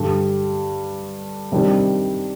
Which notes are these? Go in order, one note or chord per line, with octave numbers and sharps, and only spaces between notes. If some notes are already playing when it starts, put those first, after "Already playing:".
Already playing: G2 D3 G3
C3 D#3 G3 D4